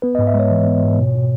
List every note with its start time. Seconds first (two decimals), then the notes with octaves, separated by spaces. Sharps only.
0.02 B3 B4
0.15 G#2 D#5
0.27 E5
0.34 G#3 C#5
0.51 E3
0.67 B3
0.83 G#2
0.99 B2
1.15 B2